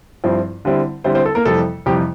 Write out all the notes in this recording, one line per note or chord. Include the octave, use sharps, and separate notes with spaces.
G2 F3 C4 E4
D3 G3 C4 E4
D3 G3 C4 E4 C5
C4 C5
A4
A#3 A#4
F2 C3 E3 G3 A4
F2 C3 E3 G3 G4